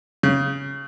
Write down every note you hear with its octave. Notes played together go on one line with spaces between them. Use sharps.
C#3